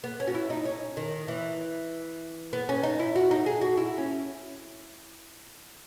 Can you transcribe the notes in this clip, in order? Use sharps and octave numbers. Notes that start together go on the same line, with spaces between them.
B3
C#4
F#4
E4
D#4
C#4
D#3
E3
B3
C#4
D#4
E4
F#4
D#4
G#4
F#4
E4
C#4